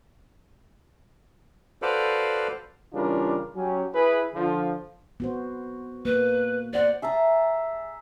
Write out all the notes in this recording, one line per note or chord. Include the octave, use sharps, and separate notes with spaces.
F#4 A4 B4 C5 D5 F5
C#3 E3 G3 D4 F4 A#4
F#3 C#4 G4
E4 G#4 B4
D3 F3
B3 F#4 C5
A#3 B4
C5 D5 F#5
G#4 E5 A5 A#5